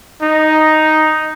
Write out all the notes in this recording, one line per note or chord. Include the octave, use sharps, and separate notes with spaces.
D#4